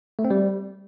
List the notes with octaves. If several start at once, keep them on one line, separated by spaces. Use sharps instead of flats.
A3
C4
G3